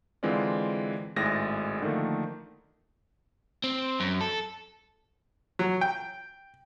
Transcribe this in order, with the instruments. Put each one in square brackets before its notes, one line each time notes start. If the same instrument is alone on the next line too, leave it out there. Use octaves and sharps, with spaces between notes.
[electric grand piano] D3 E3 G#3 C4 F4 D5
G#1 A2 G#3 G#4 A6 A#6
D3 D#3 F3 A3 A#3
[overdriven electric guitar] C4
F#2
A4
[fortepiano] F#3
G5